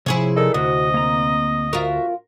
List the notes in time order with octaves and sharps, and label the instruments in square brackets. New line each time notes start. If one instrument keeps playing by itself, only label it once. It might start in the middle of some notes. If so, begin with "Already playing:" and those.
[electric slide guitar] C3 F3 [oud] E4 G#4 C#5
[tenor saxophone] A4 [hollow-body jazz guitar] A#4 D5 D#5
[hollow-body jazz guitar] D2 [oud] C3 [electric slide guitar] F#4 [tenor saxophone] D#5
[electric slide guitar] A#3 A#5
[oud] F4 A#4 [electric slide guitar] F#4 E5